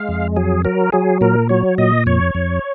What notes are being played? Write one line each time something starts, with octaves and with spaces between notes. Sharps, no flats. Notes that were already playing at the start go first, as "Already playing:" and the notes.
Already playing: G#3 F5
F2
F#3 G#4
F#3 A#4
F#3 G#4
A#2 A#4
F#3 C#5
A#2 D#5
F2 C#5
F2